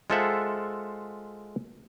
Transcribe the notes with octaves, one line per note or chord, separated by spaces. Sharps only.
G#3 F4 A4 C5 E5 F#5